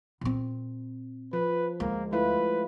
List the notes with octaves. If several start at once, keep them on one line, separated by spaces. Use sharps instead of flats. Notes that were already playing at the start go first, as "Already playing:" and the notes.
A#2 C4
F3 B4
D2 G#3 A#3
A3 E4 F4 B4